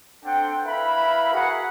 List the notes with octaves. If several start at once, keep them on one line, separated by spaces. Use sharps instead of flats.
C4 D4 A4 F#5 G5
E4 A#4 B4 E5 F5 B5
F#4 G#4 A#4 F#5